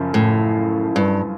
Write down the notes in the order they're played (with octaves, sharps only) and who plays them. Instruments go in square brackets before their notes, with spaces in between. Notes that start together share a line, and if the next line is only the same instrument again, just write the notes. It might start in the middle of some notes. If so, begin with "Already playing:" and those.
Already playing: [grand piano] F#2 C#3 F3
[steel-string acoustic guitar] A2
G2